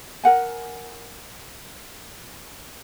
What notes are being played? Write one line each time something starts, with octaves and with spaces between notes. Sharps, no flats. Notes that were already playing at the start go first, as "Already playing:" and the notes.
A#4 F#5 G#5